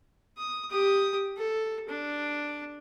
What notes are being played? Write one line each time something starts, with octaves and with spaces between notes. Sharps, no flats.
D#6
G4 D#6
A4
D4